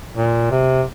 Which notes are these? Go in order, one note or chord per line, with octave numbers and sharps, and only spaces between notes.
A#2
C3